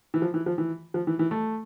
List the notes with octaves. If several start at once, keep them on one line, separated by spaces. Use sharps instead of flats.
E3
F3
E3
F3
E3
F3
E3
E3
A3